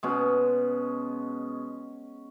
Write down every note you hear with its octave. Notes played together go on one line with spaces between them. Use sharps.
B2 G#3 C#4